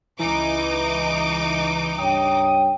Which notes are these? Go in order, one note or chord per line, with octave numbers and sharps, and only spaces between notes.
C#2 E3 D#4 D6
G2 C#5 G5 D#6